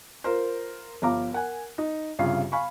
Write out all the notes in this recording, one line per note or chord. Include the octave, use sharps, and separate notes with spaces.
F4 A#4 C5
G1 F3 F5 A#5 D6
A#4 F#5 G#5
D#4
C2 G2 C#3 F4 F5 C7
F5 G#5 B5 C#6